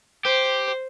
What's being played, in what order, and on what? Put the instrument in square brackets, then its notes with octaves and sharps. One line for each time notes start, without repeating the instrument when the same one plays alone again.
[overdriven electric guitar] G4 [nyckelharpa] C5